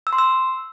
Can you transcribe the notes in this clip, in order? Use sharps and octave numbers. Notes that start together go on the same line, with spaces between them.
E6
C6
E6